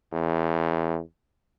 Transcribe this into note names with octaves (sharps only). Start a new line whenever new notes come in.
E2